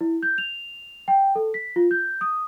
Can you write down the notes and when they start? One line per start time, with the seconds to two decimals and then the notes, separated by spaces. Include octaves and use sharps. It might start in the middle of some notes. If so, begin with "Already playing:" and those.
0.01 E4
0.23 G6
0.38 F7
1.08 G5
1.35 A4
1.54 B6
1.76 F4
1.91 G6
2.21 D#6